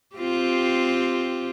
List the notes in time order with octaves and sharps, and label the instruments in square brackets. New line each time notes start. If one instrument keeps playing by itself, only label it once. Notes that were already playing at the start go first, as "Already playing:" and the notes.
[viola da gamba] C4 F4 G4